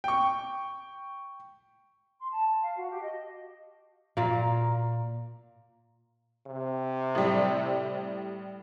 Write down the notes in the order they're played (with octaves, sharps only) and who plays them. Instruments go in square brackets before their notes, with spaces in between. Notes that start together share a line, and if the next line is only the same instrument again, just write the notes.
[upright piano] G5 C#6
[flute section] C6
A5
A5
F5
F#4
G4
D#5
[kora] A#2 A#3
[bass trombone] C3
[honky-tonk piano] A2 G3